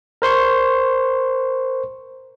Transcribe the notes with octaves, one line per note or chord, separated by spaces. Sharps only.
A#4 C5 C6 C#6